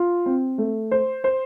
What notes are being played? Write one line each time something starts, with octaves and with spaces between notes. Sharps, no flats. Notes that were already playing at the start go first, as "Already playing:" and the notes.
Already playing: F4
C4
A3
C5
C5